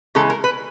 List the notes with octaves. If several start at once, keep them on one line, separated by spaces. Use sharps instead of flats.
C#3 E3 G#3 A4
A#4
B4